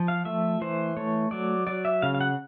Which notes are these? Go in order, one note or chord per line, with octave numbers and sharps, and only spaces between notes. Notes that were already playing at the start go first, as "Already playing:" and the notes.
Already playing: F3
F5
A3 E5
E3 C5
A3 C#5
F#3 D5
F#3 D5
E5
C#3 F5
F5
F#5